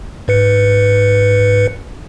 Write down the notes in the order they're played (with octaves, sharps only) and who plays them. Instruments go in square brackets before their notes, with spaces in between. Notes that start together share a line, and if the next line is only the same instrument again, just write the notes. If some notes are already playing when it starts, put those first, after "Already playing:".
[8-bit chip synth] G#2 B4 C#7